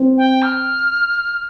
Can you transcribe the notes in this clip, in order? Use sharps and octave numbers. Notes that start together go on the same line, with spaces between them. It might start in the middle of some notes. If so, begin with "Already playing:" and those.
Already playing: C4
G5
F6